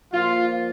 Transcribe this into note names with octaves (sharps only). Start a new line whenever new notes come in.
A#2 F3 A#3 F4